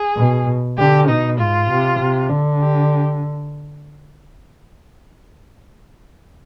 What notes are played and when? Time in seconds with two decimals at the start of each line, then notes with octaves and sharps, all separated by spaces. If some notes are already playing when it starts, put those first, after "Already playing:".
Already playing: G#4
0.17 B2
0.78 D3 G4
1.08 B2 D#4
1.38 G#2 F4
1.70 C3
1.99 C3
2.29 D3
2.60 G4